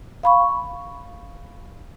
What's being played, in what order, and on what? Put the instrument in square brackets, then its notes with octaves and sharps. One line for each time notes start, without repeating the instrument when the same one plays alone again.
[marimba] F5 B5 C#6